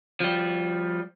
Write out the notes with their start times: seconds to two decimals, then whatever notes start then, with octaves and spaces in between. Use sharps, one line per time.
0.20 F3 G3